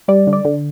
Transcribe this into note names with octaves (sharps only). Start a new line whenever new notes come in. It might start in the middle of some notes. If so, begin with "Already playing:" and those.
G3 D5
D3
D5
D3